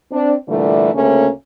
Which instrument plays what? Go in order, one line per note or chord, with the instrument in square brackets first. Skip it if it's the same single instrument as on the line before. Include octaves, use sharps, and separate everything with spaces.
[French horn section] C4 D4
A#2 D3 E3 G3 A3
D2 C#3 A3 A#3 C#4